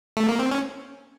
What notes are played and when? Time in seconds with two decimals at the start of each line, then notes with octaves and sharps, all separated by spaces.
0.17 A3
0.29 A#3
0.39 C4
0.51 C#4